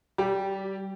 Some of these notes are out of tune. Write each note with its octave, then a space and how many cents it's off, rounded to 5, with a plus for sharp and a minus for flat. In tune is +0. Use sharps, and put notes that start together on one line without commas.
G3 -25 G4 +0